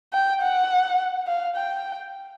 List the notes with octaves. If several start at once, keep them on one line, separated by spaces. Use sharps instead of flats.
G5
F#5
F5
G5